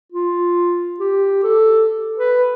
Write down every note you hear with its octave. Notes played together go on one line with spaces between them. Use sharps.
F4
G4
A4
B4